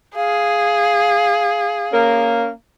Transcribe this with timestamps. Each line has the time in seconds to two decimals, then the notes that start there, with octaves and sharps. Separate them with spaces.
0.16 G#4 F5
1.92 A#3 C#4 A#4